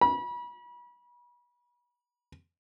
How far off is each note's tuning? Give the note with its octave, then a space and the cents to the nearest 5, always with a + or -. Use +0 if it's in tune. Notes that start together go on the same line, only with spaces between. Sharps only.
B5 -35